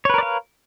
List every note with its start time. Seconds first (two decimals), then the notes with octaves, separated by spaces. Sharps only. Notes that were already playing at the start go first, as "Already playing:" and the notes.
0.05 C#5
0.10 B4
0.14 A#4
0.18 D5
0.23 F5